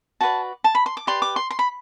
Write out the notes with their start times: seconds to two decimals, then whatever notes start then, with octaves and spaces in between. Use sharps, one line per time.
0.21 F#4 B4 D5 A5
0.64 A5
0.75 B5
0.86 C6
0.97 D6
1.07 G4 B4 D5 C6
1.22 D6
1.36 C6
1.51 C6
1.59 B5